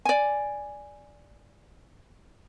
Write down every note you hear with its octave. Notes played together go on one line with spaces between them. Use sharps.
D5 G#5